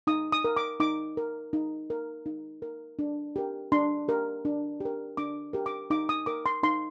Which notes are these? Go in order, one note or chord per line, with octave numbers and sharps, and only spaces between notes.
D#4 D#6
D#6
A#4
D6
D#4 D6
A#4
D#4
A#4
D#4
A#4
D4
G4 A#4
D4 C6
G4 A#4
D4
G4 A#4
D4 D6
G4 A#4
D6
D#4 D6
D#6
A#4 D6
C6
D#4 C6